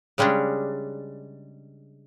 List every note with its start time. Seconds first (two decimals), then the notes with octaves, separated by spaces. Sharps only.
0.18 C#3 G3 G#3 C#4 D4